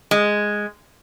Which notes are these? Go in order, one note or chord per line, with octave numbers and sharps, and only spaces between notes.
G#3